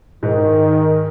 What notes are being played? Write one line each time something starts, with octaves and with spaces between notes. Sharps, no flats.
G#2 D#3